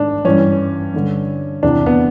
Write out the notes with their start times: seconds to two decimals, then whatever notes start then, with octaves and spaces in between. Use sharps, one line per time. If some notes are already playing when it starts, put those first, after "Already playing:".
Already playing: G#2 D#3 D4
0.25 G2 E3 C#4
0.94 G2 D3
1.63 E2 C3 E3 D4
1.86 B3